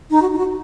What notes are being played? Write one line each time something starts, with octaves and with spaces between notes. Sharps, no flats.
D#4
F#4
D#4
F#4